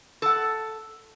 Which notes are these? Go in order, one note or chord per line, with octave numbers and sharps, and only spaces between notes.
A4 F#5